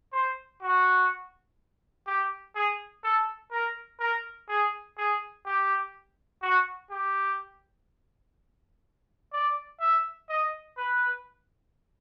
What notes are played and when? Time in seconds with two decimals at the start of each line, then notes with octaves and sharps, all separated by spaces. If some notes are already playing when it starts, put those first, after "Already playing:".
0.13 C5
0.62 F#4
2.07 G4
2.55 G#4
3.04 A4
3.52 A#4
4.00 A#4
4.49 G#4
4.97 G#4
5.45 G4
6.42 F#4
6.90 G4
9.33 D5
9.80 E5
10.29 D#5
10.77 B4